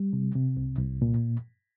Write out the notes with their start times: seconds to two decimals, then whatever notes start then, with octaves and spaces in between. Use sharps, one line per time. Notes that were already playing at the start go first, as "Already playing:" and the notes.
Already playing: G3
0.13 C3
0.35 C3
0.57 C2
0.79 C2
1.02 A#2